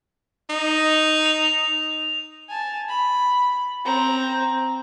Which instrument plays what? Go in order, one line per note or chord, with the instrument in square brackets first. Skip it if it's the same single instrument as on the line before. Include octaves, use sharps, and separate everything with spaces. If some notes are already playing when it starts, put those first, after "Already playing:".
[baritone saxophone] D#4
[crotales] F7
[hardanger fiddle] G#5 A5
B5
C4 A#5